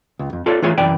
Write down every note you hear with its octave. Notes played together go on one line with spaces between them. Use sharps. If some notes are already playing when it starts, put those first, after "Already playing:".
C#2
F2
F4 A4 C#5 D5
E3 A3 F4 G#4 C#5
C2 F#2 E3 D5 G5